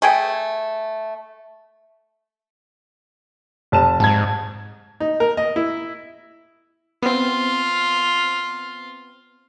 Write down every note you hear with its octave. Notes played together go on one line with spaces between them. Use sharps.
A3 G#4 G5
F1 A5 E7
G#2 A5 G#6
D#4
A#4
D#5
E4
B3 C4 F4